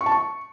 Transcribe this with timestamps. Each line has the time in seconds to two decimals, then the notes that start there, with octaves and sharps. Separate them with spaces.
0.01 C#6
0.06 A5
0.11 C#6